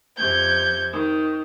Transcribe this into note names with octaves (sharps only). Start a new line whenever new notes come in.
F2 C3 G6 G#6
D#3